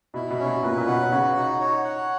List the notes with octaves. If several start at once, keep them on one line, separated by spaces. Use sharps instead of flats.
B2 E4
B2
C#4
B2
A#2 B4
A#2
B2 F#5
C#3 F#4
D#4
C#5
F#5